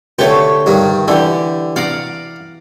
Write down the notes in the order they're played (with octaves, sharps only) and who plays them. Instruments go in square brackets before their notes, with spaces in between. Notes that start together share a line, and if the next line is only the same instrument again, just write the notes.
[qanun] D3 A3 G4 [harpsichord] B4 C#5
[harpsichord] G2 D#3
[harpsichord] D3 [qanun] E3 G4
[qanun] D5 F#5 A#5 [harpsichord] F5 D6